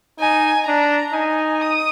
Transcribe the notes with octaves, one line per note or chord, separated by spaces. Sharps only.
D#4 G#5
D4 A#5
D#4 G#5
D#6